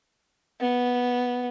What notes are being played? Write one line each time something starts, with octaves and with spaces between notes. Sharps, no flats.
B3